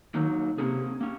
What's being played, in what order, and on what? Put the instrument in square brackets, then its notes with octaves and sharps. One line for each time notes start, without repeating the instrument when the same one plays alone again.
[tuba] D#3 [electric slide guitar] F#3 A#3 D#4
[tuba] C3 [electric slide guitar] A#3 C#4 G#4
[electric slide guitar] A#3 C#4